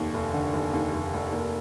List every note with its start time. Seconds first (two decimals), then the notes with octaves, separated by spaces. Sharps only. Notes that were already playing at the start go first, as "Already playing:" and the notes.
Already playing: F1 D#2
0.14 F1
0.34 D3
0.53 F1
0.73 D#2
0.93 F1
1.14 F1
1.33 A#3